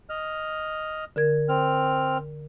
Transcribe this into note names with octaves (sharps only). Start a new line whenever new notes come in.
D#5 F6
D3 A#4 G#6
C4 F6